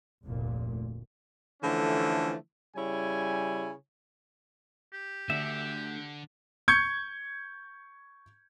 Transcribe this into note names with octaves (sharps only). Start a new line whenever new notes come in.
F1 D2 A#2
D3 E3 F3 A3 C#4
C#3 G3 E4 C#5 G#5
G4
D2 D3 E5
C#6 G6 G#6 C#7